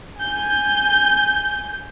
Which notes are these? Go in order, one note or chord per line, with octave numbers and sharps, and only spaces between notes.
G#5 G6